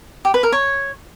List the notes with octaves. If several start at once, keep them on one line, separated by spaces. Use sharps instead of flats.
G4
B4
A#4
C#5